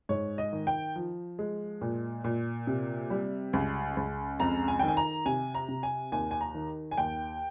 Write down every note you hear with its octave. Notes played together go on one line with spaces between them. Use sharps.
G#2 C#5
D#5
D#3
G5
F3
G#3
A#2
A#2
C3
G3
C#2
C#2
F2 A#5
G#5
D#3 G5
G#5
A#5
C3 G#5
A#5
C3
G#5
D#2 G#5
G#5
A#5
D#3
G#5
D#2 G5